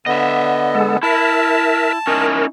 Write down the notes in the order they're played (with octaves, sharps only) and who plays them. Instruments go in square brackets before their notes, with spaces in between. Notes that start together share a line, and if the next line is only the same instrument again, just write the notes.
[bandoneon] D3 B3 [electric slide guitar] D#5 E5
[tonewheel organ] G#3 A4
[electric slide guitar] E4 [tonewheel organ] A#4 E5 [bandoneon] A5
[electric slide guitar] C#4 D#4 E4 [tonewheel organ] A#4